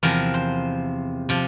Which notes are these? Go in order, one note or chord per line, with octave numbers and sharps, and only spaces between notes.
E2 C3 F3 A#4
C5
C3 F3